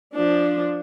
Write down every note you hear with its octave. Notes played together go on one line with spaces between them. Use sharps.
F3 D4